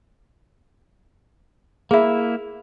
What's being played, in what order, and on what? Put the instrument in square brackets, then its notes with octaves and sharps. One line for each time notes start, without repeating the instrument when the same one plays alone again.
[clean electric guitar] A#3 E4 [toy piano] G#4 E5